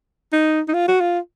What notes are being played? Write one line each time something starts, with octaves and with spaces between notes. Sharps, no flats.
D#4
D#4
F4
F#4
F4